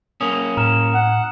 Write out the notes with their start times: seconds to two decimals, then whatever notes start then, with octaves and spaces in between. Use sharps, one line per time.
0.21 A#3 C#4 D#6
0.57 A2 A#5 F6 E7
0.94 F#5